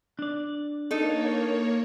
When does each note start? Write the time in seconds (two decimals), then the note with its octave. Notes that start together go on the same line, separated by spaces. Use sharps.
0.19 D4 D5
0.91 A#3 D#4 A4 C#5